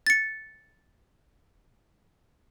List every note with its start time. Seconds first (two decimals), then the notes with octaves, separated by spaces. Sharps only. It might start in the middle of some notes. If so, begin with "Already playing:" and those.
0.07 A6 C#7